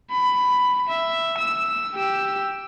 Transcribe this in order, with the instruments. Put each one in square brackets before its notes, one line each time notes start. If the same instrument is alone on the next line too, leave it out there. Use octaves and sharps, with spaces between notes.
[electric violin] B5
E5
E6
G4 E6